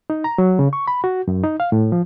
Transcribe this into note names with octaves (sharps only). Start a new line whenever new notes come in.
D#4
A#5
F#3
C#3
C#6
B5
F#4
F#2
D#4
F5
A2
F3